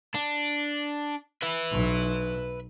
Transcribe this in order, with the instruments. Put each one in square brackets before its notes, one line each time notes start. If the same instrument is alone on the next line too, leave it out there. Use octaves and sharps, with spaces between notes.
[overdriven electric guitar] D4
B4 E5
[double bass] B1